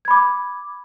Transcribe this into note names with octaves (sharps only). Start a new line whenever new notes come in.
B5 D6 G#6